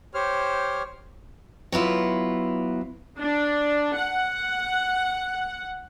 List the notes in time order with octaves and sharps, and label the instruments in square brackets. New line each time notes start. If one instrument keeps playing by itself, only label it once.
[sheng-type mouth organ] G4 C5 C#5 F6
[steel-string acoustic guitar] F#3 B3 E4 F4
[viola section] D4
F#5